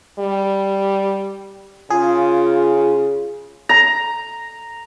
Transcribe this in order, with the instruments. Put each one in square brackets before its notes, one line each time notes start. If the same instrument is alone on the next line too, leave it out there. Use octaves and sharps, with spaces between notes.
[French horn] G3
[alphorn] C#3 [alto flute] F4 [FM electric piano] G#4
[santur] A#5